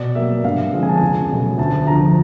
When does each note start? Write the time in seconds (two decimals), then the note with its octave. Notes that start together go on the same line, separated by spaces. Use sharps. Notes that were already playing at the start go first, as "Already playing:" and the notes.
Already playing: B2 D5
0.15 F#3 A#3 E5
0.44 G2 F5
0.73 D3 F3 G#3 C4
0.83 G#5
0.89 A5
0.97 C#2 G#5
1.30 B2 F#3 A3
1.58 D2 A5
1.87 D3 F3 A#5